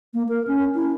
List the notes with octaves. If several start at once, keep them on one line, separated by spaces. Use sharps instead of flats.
A#3
A#4
C#4
E4